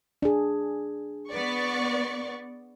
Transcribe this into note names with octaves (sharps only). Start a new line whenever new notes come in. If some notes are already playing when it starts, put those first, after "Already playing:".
D4 G#4
B3 D5 C#6